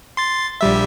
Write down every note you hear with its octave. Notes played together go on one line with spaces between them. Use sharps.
C6 A6
A#1 G3 E5